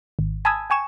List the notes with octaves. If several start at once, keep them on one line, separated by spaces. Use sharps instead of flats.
G#1
G#5 A5 B5 D#6 E6 G#6
G5 G#5 C#6 E7